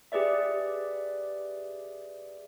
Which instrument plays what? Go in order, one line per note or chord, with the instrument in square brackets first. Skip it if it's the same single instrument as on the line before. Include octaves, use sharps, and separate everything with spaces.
[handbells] G4 G#4 B4 D5 E5